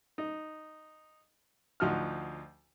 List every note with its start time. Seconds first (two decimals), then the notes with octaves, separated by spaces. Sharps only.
0.18 D#4
1.80 D2 F3 D#4 F#4 F6